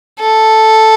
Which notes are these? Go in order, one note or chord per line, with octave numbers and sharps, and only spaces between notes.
A4